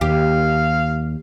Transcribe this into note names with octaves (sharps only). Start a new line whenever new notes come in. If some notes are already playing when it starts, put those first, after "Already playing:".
D#2 G4 F5